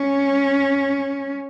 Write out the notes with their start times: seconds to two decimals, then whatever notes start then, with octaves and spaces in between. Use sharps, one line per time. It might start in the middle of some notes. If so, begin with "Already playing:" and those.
Already playing: C#4